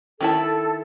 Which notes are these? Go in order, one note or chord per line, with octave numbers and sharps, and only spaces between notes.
D#3 E4 A4 A5